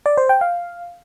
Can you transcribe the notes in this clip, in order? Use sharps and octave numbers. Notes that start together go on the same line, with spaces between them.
D5
C5
G5
F5